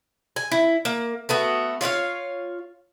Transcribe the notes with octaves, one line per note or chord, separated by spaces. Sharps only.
G#5
E4
A#3
A3 B3 F#4
F4 C#5 E5 F5